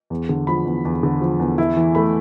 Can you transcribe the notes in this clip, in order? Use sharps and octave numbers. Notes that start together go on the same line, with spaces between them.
E2
D3
F3 B5
E2
E2
D3
F3
E2
E4
E3
A3 B5